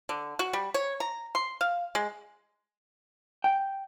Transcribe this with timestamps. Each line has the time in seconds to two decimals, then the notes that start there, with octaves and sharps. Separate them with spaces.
0.09 D3
0.39 F#4
0.53 G3
0.74 C#5
1.00 A#5
1.35 C6
1.61 F5
1.95 G#3
3.44 G5